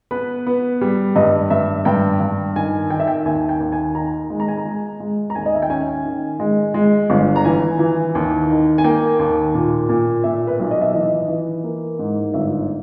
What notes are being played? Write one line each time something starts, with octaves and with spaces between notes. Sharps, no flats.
B3 B4
B3
G3
G2 D#5
G2 E5
G2 G5
G2
D#3 G#5
D#3 G5
E5
G5
D#2 G#5
G5
D#2
G#5
D#3 A#5
G#3
A#5
G#5
A#5
G#3
G#3
A#5
D#2 G#5
D#5
E5
G5
C#4 G#5
D#3
G#3
G#3
G1
A#5
E3 G#5
E3
D#2
D#3
G#5
A#3 G5
D#2
A#2
A#2
A#2 E5
B4
B1
D#5
E5
E3 D#5
E3
A#3
G#2
G1 E5